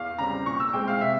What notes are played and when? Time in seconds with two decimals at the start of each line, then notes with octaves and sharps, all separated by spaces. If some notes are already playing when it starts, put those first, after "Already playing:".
Already playing: E2 F5
0.18 C#3 G3 C4 A#5
0.46 A#2 C#6
0.60 E6
0.73 G#3 C4 G5
0.88 F5
1.01 C3 E5